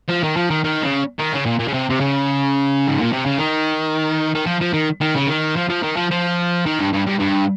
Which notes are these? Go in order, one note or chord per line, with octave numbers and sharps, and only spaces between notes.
F3
D#3
F3
D#3
D#3
C#3
D#3
C#3
A#2
A#2
C#3
C3
C3
C#3
G#2
A#2
C3
C#3
D#3
D#3
F3
F3
D#3
D#3
C#3
D#3
F3
F3
D#3
F3
F3
D#3
G2
G2
G2
G2